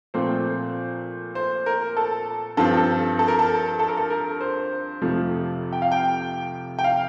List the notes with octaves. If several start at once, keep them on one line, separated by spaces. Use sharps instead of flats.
A#2 F3 A3 C4 C5
C5
A#4
A4
G2 F3 C4 A4
A4
A4
A#4
A4
A4
A#4
A4
A#4
C5
F2 C3 F3 A3
G5
F5
G5
G5
F5